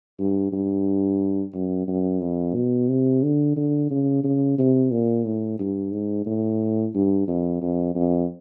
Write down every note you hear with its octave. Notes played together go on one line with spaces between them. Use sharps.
G2
G2
F#2
F#2
F2
B2
C3
D3
D3
C#3
C#3
C3
A#2
A2
G2
G#2
A2
G2
F2
F2
F2